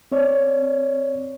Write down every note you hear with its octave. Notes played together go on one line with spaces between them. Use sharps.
C4 C#5 D5